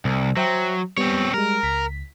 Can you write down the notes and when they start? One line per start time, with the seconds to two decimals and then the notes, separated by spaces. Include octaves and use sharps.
0.05 C2
0.37 F#3 C5 E5 G5
0.97 G3 B3 C4 C#5
1.34 G3 G#3 A#4
1.63 C#2 B6